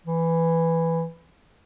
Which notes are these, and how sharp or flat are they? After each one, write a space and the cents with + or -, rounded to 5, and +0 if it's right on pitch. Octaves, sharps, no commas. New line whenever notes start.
E3 +5